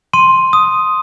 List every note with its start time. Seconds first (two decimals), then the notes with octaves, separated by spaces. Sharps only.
0.13 C6 D#7
0.53 D#6